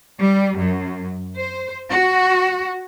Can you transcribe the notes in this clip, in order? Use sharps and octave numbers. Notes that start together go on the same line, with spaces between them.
G3
F#2
C5
F#4